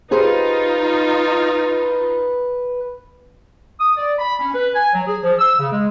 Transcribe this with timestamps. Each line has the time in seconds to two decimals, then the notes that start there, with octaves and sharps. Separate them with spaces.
0.11 D#4 F4 G4 G#4 B4 C5
3.80 D#6
3.97 D5
4.18 B5
4.39 C#4
4.55 B4
4.74 G#5
4.93 F#3
5.07 G#4
5.22 F3
5.39 E6
5.59 C#3
5.72 G#3